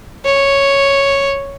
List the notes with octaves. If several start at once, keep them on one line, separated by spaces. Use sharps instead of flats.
C#5